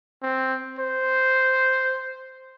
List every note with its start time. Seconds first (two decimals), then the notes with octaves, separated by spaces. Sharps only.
0.23 C4
0.79 C5